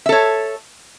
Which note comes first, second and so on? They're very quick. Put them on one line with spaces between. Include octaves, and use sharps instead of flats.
E5 A4 C#5